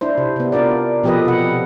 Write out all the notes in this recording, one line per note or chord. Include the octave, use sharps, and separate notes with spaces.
D4 E4 C5
C3
C3 B3
D4 F4 A#4 D5
B2 F3 G4 A4 B4 D#5
C3 F#5